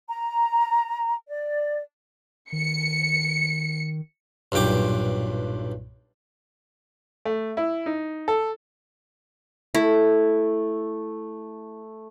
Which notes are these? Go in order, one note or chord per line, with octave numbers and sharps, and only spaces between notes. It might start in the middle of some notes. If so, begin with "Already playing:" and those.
A#5
D5
D#3 C#7
B1 G2 A#2 G5 D6
A3
E4
D#4
A4
A3 E4